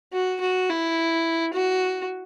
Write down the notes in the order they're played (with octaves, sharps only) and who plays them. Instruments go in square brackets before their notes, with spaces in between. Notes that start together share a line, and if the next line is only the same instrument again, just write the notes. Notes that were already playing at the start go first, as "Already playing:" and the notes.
[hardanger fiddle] F#4
F#4
E4
F#4